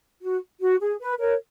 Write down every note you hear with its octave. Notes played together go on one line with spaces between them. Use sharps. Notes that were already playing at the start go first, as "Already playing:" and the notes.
F#4
F#4
G#4
B4
A#4 C#5